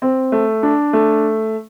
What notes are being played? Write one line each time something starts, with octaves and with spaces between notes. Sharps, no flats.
C4
A3
D4
A3